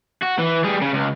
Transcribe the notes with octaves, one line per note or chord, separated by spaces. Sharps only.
F#4
E3
G3 G#4
C#3
C#2